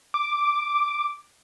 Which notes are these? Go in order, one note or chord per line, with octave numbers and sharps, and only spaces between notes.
D6